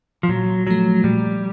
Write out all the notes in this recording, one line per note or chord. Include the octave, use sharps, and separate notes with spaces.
F3
A#2 F#3
F3 F#3 A3
A#2 G3